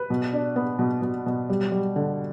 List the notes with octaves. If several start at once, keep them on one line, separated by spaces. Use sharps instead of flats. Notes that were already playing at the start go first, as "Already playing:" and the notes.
Already playing: B4
B2
D4
B3
B2
B2
B2
G3
G3
D3